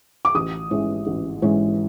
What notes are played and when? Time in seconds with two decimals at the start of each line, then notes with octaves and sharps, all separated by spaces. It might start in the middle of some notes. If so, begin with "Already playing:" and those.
0.25 D6
0.35 A1 D#6
0.71 G#2 E3 G#3 C#4
1.07 A1
1.42 G#2 E3 G#3 C#4